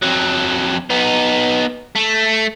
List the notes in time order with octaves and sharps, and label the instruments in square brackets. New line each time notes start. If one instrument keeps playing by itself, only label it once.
[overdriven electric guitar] F2 F#3
B3 D#4
A3